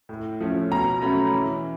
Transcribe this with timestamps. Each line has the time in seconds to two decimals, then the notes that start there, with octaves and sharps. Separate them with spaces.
0.09 A2
0.40 F3 A3 C#4
0.70 B2 A#5
1.02 F#3 A3 C#4 B5
1.33 E3